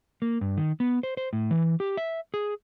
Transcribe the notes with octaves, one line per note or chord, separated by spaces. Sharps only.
A#3
G2
D#3
B3
C5
C5
A2
E3
G4
E5
G#4